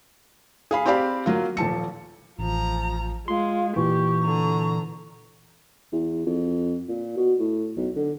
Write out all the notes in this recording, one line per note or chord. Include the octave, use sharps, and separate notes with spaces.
G#4 F5 B5
C4 G4 D5 F5 B5
F#3 A#3 F4
D#1 F3 A5 C#7
A1 F3 A#5
G#3 F4 C6
A#2 E3 G4 C#6
D3 A#5
E2
F2
A#2
B2
A2
B1
D3